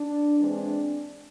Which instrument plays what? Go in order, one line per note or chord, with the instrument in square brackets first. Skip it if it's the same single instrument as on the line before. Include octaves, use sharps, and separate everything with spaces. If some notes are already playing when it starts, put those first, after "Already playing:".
Already playing: [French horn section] D4
E3 G#3 C4 D4